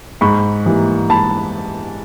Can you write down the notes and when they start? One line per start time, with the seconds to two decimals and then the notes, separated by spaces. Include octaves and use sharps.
0.21 G#2 B5 C#6
0.65 E3 G3 A#3
1.10 G#2 A5 B5